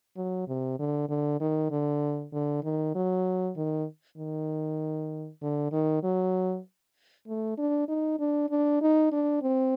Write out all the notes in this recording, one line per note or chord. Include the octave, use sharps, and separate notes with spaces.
F#3
C3
D3
D3
D#3
D3
D3
D#3
F#3
D#3
D#3
D3
D#3
F#3
A3
D4
D#4
D4
D4
D#4
D4
C4